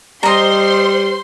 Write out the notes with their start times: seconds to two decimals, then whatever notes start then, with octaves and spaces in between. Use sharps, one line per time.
0.23 G3 C5 D#5 A#5 C6